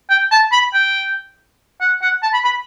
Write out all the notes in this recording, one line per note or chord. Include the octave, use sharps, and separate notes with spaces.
G5
A5
B5
G5
F#5
F#5
A5
B5
B5